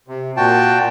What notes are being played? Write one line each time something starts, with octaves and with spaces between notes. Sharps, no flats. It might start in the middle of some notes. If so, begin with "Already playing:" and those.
C3
A#2 F#4 G5 A5